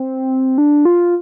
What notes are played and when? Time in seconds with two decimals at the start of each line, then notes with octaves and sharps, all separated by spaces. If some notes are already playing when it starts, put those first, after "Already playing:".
Already playing: C4
0.58 D4
0.85 F4